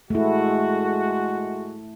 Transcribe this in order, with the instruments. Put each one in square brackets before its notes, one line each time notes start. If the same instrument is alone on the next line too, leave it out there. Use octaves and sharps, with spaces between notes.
[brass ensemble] G#3 F#4 [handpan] A3 E4